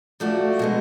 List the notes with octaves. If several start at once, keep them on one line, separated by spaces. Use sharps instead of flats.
F3 A3 D4 F#4
B2 G#3 B3